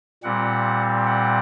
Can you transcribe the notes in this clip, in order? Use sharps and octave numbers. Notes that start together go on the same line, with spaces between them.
A#2 G3 C4 F#5
F#5